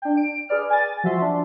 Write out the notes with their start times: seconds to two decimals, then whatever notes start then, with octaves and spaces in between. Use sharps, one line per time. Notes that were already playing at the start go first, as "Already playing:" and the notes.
0.02 D4 G5
0.17 D7
0.49 G#4 B4 D5 F6
0.70 G#5 A6
1.04 F3 F#4 E5 C6
1.22 D4